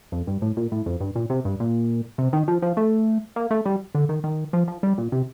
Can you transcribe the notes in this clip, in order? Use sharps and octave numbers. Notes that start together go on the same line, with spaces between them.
F2
G2
A2
A#2
A2
F2
G2
A#2
C3
G2
A#2
C3
D#3
F3
F3
A3
A#3
A3
G3
D3
D#3
D#3
F3
F3
G3
A#2
C3